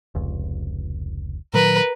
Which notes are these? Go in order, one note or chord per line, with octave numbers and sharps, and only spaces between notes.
F1 C#2
A#2 D#3 F#3 A#4 B4